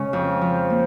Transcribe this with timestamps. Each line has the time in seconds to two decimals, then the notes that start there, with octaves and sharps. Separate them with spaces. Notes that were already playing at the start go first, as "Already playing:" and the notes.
Already playing: C#3 G#3 C#4
0.13 F2
0.41 F3
0.70 A#3